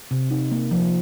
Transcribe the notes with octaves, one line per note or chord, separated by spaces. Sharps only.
C3
D#4
A#3
F3